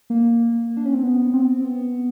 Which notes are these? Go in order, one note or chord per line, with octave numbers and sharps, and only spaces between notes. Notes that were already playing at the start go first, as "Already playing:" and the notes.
A#3
D4
C#4
C4
B3
C4
B3